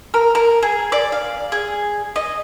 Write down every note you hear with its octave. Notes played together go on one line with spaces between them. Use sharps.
A#4
A#4
G#4
D5
F5
G#4
D#5